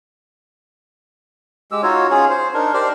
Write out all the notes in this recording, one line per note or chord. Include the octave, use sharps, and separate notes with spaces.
G#3 G4 E6
D#4 F4 F#4 C#5
C#4 F4 G#4 C#5
C5
D4 D#4 A#4
G4 A#4 C5 D5